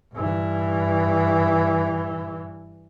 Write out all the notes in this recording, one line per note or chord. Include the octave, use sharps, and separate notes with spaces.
G2 E3